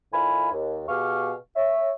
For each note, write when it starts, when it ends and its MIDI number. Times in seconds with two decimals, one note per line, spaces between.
0.13 0.48 45
0.13 0.48 51
0.13 0.48 65
0.13 0.48 80
0.13 0.48 83
0.52 0.83 39
0.89 1.33 47
0.89 1.33 67
0.89 1.33 68
0.89 1.33 77
0.89 1.33 85
0.89 1.33 89
1.56 1.90 73
1.56 1.90 76